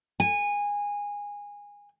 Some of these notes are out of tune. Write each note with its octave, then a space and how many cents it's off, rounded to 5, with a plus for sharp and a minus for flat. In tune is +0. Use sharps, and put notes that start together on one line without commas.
G#5 -20